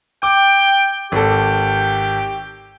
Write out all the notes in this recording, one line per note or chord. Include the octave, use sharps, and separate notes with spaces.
G5 D6
G#1 G4 A4